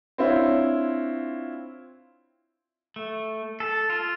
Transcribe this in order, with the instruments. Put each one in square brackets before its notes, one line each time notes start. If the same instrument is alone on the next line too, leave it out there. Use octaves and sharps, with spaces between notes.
[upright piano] C4 D4 E4 F4 C#5
[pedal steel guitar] A3
A4
F4